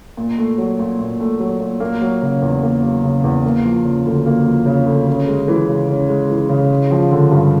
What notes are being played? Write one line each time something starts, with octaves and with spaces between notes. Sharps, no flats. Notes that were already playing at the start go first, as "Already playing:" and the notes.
A#2
A3
F#3
A#2
A#2
A3
F#3
A#2
A#3
F#3
C#3
E2
A#3
F#3
C#3
E2
A#3
F3
C#3
D2
A#3
F3
C#3
D2
C#4
G#3
E3
C#3
C#4
G#3
E3
C#3
G#3
F3
D3
G2